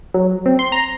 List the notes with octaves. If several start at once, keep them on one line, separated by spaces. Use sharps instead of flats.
F#3
C4
C6
A#5